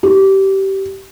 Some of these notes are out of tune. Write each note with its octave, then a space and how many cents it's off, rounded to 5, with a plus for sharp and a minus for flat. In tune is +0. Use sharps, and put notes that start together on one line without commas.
G4 -20